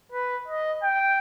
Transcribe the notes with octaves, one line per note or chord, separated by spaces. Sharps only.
B4
D#5
G5